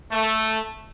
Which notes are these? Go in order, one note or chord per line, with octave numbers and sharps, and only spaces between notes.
A3